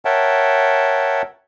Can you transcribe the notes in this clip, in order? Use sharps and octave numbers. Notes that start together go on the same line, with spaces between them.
A#4 C#5 E5 F#5 G5 A5